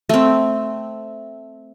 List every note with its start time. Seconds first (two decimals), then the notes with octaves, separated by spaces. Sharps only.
0.09 A3 C4